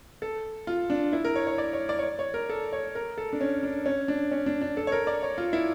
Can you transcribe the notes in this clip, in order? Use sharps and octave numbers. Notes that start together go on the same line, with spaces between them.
A4
F4
D4
E4
A#4
C#5
C#5
D5
C#5
D5
C#5
D5
C#5
A#4
A4
C#5
A#4
A4
D4
C#4
D4
C#4
D4
C#4
D4
D4
A4
C#5
A#4
D5
C#5
F4
E4